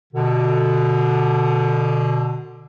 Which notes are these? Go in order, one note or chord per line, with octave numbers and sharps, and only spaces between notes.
B2 D3